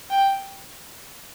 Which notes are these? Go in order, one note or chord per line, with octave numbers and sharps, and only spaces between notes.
G5